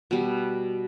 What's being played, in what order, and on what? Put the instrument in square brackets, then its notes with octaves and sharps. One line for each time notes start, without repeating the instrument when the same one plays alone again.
[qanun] B2 G3